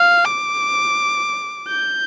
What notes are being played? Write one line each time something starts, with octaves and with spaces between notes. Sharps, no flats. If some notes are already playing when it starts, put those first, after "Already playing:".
Already playing: F5
D6
G6